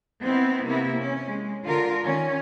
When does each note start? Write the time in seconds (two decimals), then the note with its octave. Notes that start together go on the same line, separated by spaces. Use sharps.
0.23 B3 C4 D#4 E4
0.64 C3 A#3 B3 E4
0.97 C#4
1.28 G#3
1.64 D3 F4 A#4
2.04 D#3 C#4